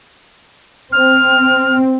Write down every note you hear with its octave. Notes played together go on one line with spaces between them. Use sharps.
C4 F6